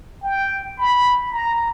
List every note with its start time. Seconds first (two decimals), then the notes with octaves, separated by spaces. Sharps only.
0.23 G5
0.78 B5
1.31 A#5